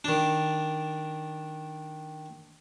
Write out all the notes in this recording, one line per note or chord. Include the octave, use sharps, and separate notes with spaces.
D#3 D4